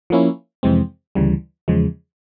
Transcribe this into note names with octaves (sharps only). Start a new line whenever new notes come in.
F3 A#3 C#4 E4
F2 C3 E3 G#3 C4
D2 C#3 E3 G3
E2 C#3 F3 G#3